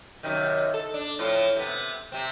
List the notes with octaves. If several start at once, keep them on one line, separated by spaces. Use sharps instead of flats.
F#2 C3 D#3
A4
D4
A2 F3 F4
C3 B3
C3 C4